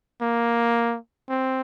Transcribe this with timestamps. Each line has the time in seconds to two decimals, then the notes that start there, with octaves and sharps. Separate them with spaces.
0.22 A#3
1.29 C4